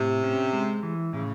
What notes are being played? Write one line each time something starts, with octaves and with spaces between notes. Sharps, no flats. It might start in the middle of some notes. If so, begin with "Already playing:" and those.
Already playing: A2 C3
C#4
G#3
E3
A2 C#3